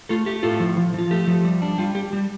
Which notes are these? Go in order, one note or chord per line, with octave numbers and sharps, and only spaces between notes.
A3 F4 A4
A3 G4
A2 F4 A4
F3
F3
F3 F4
A3 G4
F3
G3
D4
G3 F4
G3 G4
G3